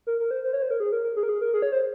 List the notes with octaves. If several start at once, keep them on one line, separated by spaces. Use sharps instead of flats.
A#4
A#4
C5
C5
C#5
C5
A#4
G#4
A#4
A#4
G#4
A#4
G#4
A#4
G#4
C#5
C5